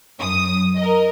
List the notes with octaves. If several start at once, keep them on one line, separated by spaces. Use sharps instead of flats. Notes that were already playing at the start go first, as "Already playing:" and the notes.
F#2 D#6
A#4 D#5